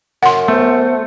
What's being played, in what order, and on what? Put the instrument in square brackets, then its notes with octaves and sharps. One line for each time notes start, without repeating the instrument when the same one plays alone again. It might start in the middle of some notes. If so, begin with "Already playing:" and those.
[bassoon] F#2 [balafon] F#5 C6
[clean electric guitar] A3 [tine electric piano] B3 C5